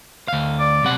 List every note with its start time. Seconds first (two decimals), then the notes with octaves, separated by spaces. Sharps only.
0.28 D2 F5
0.60 D5
0.83 B1 C3 F#5